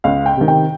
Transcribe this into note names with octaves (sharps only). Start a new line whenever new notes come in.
C#2 F5
G5
C3 D#3
G5